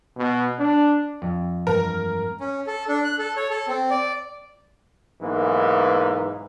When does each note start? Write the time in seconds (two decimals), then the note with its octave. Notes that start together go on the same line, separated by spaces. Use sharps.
0.17 B2
0.60 D4
1.22 F2
1.67 G2 E3 G#3 A#4
2.40 C#4
2.67 A4
2.89 D4
3.04 F#6
3.18 A4
3.36 C#5
3.50 A4
3.68 C4
3.90 D5
5.22 B1 G#2 E3 A#3